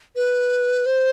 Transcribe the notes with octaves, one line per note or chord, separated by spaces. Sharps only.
B4
C5